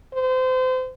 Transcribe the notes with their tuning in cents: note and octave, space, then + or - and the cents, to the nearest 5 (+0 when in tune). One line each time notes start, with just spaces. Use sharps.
C5 -30